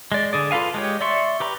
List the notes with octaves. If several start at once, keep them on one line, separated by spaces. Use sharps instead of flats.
G#3 D5
D3 G#4 D5
F4 A4 B4 F5 G#5
G#3 G4 C#5
D5 E5 C6 C#6
G4 B4 A#5